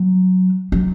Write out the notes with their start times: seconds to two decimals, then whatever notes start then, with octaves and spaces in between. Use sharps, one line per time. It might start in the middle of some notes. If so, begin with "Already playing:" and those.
Already playing: F#3
0.72 F#3